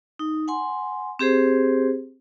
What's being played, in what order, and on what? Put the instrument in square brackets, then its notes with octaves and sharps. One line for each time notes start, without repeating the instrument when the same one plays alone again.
[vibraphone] D#4
F#5 G#5 C6
C4 G4 G#4 C5